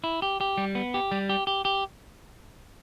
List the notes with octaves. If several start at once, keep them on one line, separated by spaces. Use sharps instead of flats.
E4
G4
G4
G3
B3
G4
G3
G4
G4
G4